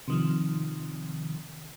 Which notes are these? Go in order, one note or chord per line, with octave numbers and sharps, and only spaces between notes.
C3 D#3 F3